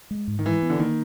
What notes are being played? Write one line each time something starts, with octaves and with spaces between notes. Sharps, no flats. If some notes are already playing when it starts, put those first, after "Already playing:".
G#3
G#2
D#3
E3 G#3
B3
D3
D#3 A#3